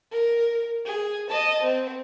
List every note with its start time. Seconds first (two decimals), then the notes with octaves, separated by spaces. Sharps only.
0.12 A#4
0.85 G#4
1.29 D#5 A5
1.63 C4